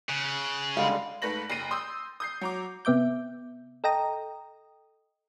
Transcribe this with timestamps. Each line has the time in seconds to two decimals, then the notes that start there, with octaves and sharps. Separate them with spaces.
0.09 C#3 F#6
0.77 D3 G3 G#3 F5
1.22 G#2 A3 B4 A#6 F#7
1.50 F#1 C7 D#7
1.71 C6 D#6 E6 G6
2.20 D#6 G6 C7
2.41 F#3 A#5 D6
2.85 C3 B3 E5 D6 G6
3.84 A4 D#5 G5 A#5 D#6